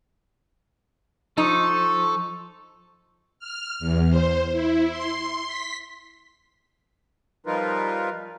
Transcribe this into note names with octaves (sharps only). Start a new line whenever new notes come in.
F3 D#4 A4 C#6
F6
E2
C5
E4
C6
B6
F3 G3 D#4 F4 A#4 B4